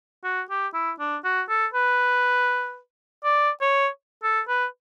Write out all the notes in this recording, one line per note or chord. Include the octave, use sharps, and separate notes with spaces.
F#4
G4
E4
D4
F#4
A4
B4
D5
C#5
A4
B4